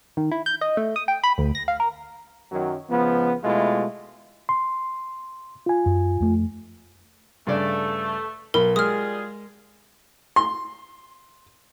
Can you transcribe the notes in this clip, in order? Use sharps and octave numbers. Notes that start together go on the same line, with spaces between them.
D#3
E4
G6
D#5
A3
D#6
G5
B5
D2
A#6
F5
A#4
F#2 D#3 F#3
C#2 F3 B3
B2 G#3 A3 E4 F4
C6
F4 G#5
F#2
F2 A3
G2 C#3 A3 D5
B1 A#4 B5
G3 G#3 F4 G#4 D#6 F6
C6